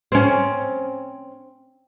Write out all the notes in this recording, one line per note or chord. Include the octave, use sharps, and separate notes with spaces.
C4 C#4